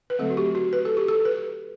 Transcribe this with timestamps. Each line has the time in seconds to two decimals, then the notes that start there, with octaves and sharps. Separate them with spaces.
0.10 B4
0.19 D3 F#3 A3 C4 A4
0.30 F#4
0.37 G4
0.55 F#4
0.73 B4
0.85 A4
0.97 G4
1.08 A4
1.25 B4